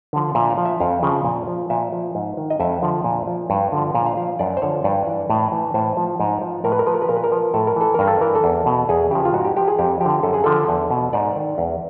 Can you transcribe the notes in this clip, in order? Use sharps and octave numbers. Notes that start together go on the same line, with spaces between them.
D3 F3
A#2 E5
F5
F3
E5
F2 F5
C#3 F3
A#2
F3
A#2 E5
F3
G#2
D#3
D#5
F2 E5
D3 F3
A#2
F3
G2
D3 F3
A#2 F5
F5
F3 F5
F#2 D5
C5
D3 F3 C#5
G2 D5
E3
A2
E3
A2 C5
F3
G#2
F3
A2 A#4
B4
A#4
F3 B4
A#4
B4
A#2 A#4
B4
A#4
F3
A2 A4
A#4
E3 A4
G2 A#4
A4
E3 A#4
A4
E2
B2
E2 G#4
C#3 F3 G4
F4
G#2 F#4
G4
F3 G4
G#4
F2 G4
D3 F3 G4
F#2 A4
G#4
D3 F3 A4
E2
B2
G#2 D5
D#3
E2